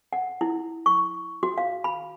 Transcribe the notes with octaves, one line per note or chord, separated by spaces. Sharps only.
F#5
E4
C#6
F#4
F5
B5